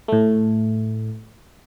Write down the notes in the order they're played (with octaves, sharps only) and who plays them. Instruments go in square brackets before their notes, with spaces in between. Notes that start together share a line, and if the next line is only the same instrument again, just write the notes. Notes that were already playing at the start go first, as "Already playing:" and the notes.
[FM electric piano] A2 A3